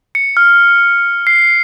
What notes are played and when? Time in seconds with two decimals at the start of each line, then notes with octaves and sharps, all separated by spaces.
0.15 C#7
0.37 F6
1.27 C7